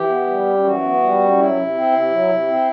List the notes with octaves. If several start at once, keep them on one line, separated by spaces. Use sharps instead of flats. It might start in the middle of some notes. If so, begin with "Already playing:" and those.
Already playing: E3 G4
B3
G3
F#2
E3 F#4
B3
G3
F#2
F#3 E4
C3
C4
C3
F#3
C3
C4